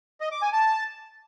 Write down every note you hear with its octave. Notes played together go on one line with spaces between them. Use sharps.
D#5
D6
G#5
A5